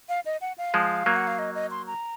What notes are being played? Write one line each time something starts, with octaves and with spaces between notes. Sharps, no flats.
F5
D#5
F#5
F5
F3 G#3
F#3 A#3
F#5
F5
D#5
D#5
C6
A#5